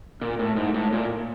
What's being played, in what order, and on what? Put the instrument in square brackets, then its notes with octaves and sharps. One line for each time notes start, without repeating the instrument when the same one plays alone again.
[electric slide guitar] A#2
A2
G#2
A2
A#2